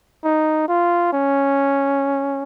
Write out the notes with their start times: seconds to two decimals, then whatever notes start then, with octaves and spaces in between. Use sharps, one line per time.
0.24 D#4
0.68 F4
1.13 C#4